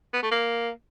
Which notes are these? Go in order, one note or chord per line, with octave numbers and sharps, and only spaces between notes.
B3
A3
A#3